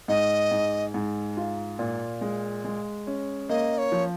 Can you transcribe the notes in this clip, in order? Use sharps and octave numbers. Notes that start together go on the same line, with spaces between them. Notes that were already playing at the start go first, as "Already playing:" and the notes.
G#2 D#5
G#2
G#2
F4
A#2
G#3
G#3
C#4
A#3 D#5
C#5
F3